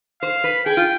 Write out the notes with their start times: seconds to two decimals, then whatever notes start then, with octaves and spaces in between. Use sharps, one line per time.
0.22 C5 F5
0.44 B4
0.66 G#4 G5
0.77 F4